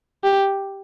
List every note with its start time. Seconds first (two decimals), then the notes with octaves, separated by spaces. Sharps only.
0.24 G4